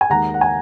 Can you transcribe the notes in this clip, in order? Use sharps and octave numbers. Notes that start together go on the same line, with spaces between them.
G#5
D#2 D#3 G#3 F#5 A#5
F#5
G#5